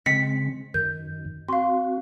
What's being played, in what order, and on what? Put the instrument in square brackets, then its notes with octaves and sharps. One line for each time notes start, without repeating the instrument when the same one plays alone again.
[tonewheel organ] C#3 G#3 C4 [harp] B6 [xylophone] C#7
[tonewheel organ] F#2 D#3 [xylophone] G6
[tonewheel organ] C4 F#4 [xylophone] F5 C6